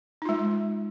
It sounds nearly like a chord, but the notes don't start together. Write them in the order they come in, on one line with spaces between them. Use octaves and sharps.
D#4 F4 G#3